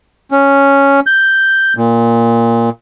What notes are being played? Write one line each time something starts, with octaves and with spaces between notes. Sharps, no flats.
C#4
G6
A#2